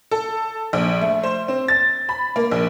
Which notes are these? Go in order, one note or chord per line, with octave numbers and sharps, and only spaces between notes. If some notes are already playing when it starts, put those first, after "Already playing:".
A4
A#1
A3
C5
C4
A6
B5
A#3
A#1